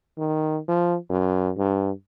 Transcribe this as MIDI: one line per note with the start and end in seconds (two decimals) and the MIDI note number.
0.18 0.59 51
0.68 0.96 53
1.10 1.52 42
1.58 1.91 43